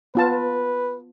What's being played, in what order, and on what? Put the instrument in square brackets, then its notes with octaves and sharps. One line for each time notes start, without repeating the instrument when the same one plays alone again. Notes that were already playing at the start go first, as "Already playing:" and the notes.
[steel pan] B3 F4 A5 [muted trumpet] B4